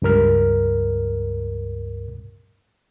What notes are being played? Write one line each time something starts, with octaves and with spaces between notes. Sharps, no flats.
C#2 G2 A#4 F6